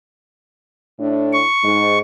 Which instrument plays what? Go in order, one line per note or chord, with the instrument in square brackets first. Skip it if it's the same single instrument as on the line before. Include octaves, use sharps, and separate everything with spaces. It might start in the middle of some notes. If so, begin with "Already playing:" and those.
[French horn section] A2 D4
[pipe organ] C#6
[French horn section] G#2